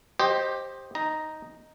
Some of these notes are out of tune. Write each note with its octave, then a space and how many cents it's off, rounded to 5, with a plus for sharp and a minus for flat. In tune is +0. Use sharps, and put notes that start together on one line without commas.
G4 +0 C5 +15 D#5 +0
D#4 +0 A#5 +0